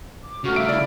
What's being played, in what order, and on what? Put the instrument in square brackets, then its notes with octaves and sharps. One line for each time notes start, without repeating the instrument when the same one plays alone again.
[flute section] D6
[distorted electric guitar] C#3 A3 [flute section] F#4 C#6 F6
[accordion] E5 E6 F6 [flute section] F5 [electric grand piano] D7
[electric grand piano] E4 D5